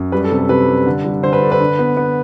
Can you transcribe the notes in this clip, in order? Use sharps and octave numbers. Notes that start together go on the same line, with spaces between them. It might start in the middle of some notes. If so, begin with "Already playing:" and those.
Already playing: F#2
G3 B4
A4
C3
A4
C3 B4
G3
D3
G3
D3 C5
B4
D4 A4
B4
D3
B3
B3